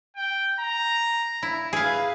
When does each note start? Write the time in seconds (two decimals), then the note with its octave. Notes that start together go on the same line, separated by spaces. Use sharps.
0.16 G5
0.60 A#5
1.43 E4
1.73 G#4 B4 F5